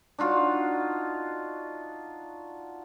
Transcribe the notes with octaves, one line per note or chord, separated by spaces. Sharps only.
D4 D#4 F4 F#4